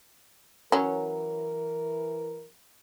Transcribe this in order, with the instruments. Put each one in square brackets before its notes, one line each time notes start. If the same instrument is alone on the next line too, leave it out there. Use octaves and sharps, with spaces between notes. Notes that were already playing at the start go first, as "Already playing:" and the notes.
[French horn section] E3 A#4 [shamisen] F#3 C#4